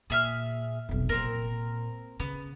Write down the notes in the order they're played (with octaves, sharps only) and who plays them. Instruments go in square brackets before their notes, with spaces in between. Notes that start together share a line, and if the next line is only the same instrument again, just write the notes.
[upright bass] A#2 [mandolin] G#4 E5 F6
[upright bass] F1 B1
[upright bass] A#2 [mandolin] C4 A#4
[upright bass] C#3 [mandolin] B3